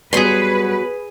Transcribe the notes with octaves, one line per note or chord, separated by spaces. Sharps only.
F#3 G3 B3 G#4 B4 C6